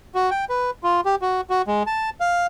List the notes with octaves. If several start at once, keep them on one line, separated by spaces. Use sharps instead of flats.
F#4
G5
B4
F4
G4
F#4
F#4
G#3
A5
F5